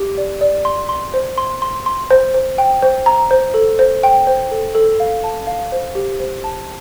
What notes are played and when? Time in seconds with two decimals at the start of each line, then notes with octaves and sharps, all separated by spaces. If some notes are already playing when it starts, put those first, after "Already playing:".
Already playing: G4
0.18 D5
0.41 D5
0.65 C6
0.89 C6
1.14 C5
1.38 C6
1.62 C6
1.86 C6
2.11 C5
2.34 C5
2.58 G5
2.82 C5
3.06 A#5
3.31 C5
3.54 A4
3.79 C5
4.03 G5
4.27 C5
4.51 A4
4.75 A4
5.00 F5
5.24 A5
5.47 F5
5.72 C5
5.95 G4
6.20 C5
6.44 A5